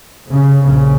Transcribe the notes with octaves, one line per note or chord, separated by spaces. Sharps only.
C#3
A#1 C#3